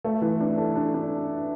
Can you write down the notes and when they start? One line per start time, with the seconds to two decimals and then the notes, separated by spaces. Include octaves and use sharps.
0.04 A3
0.22 E3
0.40 D4
0.57 A4
0.75 D4
0.94 D4